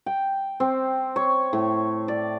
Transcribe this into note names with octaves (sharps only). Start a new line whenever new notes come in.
G5
C4
C#5
A2
D5